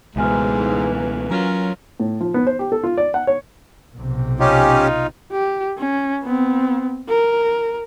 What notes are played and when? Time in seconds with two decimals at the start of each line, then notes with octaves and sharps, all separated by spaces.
0.16 C#2 G#2 B2 E3 A#3 E5 G#5 F6
1.31 F#3 C#4 F4 A#4
2.00 A2
2.20 F3
2.34 B3
2.47 C5
2.59 G4
2.72 A4
2.84 F4
2.97 D5
3.14 F#5
3.27 C#5
3.97 B1 C3
4.40 C#4 D#4 F4 G4
5.32 G4
5.78 C#4
6.23 B3 C4
7.09 A#4